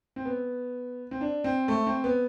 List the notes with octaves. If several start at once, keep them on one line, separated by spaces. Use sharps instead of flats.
C4
B3
C4
D4
C4
A3
C4
B3